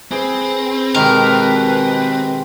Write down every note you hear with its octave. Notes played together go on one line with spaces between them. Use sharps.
C4 G#4 B4
B2 D#3 G#3 G4 A#4 B4